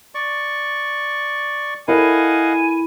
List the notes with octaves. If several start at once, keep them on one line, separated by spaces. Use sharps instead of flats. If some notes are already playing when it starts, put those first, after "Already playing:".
D5 C#6
E4 A4 A#4 D#5 F5 F#5 G#5